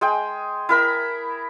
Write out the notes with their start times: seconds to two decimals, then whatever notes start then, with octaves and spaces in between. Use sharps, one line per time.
0.01 G#3 G#4 G5
0.69 E4 A#4 B5